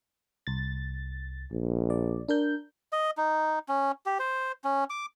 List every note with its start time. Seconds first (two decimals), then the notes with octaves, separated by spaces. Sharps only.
0.47 C2 A6
1.51 A#1
1.90 D5
2.28 D4 A#4 G6
2.93 D#5
3.17 D#4
3.68 C#4
4.06 G4
4.19 C5
4.64 C#4
4.90 D6